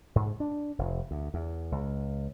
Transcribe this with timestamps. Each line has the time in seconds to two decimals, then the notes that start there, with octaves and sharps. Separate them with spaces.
0.16 G#2
0.40 D4
0.79 F1
1.11 D2
1.34 E2
1.72 C#2